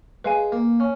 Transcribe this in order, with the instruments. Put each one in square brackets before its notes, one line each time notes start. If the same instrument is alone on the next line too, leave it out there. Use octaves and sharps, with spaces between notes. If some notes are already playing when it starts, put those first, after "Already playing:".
[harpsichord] G#3 [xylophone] B4 F5 G#5
[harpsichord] A#3
C#4